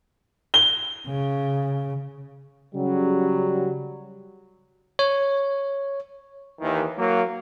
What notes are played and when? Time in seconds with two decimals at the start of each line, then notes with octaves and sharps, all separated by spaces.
0.54 G7
1.07 C#3
2.75 C#3 F#3 G3
4.99 C#5
6.61 D#2 D#3 E3
6.97 F#3 A#3